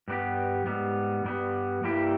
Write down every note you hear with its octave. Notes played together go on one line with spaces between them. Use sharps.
G2 G3 B3 G4
G#2 G3 B3
G2 G3 B3
G2 G3 A#3 E4 G4